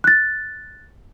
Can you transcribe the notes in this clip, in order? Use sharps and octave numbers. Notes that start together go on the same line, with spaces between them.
F#6 A6